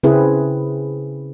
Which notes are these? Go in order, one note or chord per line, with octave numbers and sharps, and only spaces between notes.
C#3 C4 E4 G#4 B4